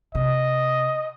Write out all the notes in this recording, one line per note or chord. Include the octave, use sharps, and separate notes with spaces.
C3 D#5